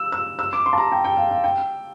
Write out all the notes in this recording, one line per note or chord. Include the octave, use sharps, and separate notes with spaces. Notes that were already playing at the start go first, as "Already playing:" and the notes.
Already playing: E6
E6
E6
D6
C6
A5
A#5
G5
G5
F5
F5
G5